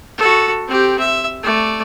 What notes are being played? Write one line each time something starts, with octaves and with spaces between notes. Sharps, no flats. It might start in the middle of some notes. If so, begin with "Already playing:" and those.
F#4 A4
C4 G4
E5
A3 D5